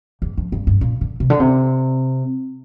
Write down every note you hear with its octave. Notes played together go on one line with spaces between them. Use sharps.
E2
F2
G2
G2
A#2
D3
C3
D3
C3